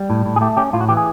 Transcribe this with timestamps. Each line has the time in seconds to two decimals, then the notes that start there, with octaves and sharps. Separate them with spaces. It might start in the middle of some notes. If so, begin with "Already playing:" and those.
Already playing: G3
0.10 A2
0.26 A2
0.36 G#4
0.41 A3 G4
0.57 C#4 G4
0.73 A2 F4
0.81 F#4
0.89 E3 G4
0.97 G#4